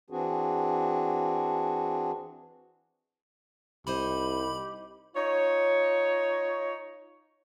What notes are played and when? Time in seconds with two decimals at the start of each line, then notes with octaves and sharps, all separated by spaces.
0.10 E3 C4 D4 F#4 G#4
3.87 C2 D#4 G4 C5 D#5 B5
5.15 D#4 F4 C#5